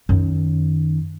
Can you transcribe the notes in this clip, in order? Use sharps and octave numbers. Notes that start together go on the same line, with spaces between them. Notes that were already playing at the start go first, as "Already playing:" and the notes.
F#2 D#3